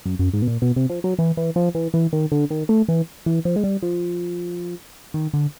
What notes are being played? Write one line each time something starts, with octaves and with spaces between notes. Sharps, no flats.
F#2
F#2
G#2
B2
A#2
B2
C3
F3
F#3
E3
E3
F3
E3
E3
D#3
D3
D#3
A3
E3
E3
F3
G#3
G3
F3
D#3
D3